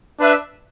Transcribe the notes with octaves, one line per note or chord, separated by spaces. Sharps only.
D4 B4 E5